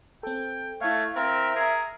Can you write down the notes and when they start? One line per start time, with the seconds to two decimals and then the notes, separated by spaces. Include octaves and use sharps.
0.23 C4 A4 G5
0.81 A3 E4 C#5 F5
1.16 C4 A#4 E5
1.56 G#4 A#4